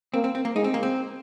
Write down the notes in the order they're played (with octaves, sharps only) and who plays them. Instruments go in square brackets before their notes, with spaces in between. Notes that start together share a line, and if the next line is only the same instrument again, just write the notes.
[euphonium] A#3 [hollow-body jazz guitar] C4
[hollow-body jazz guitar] C4
C4
A#3
[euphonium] G#3 [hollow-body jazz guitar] D#4
[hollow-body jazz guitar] C4
A#3
C4